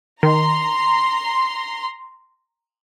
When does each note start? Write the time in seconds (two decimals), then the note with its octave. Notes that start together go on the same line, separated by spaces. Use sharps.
0.23 D#3 A#5 C6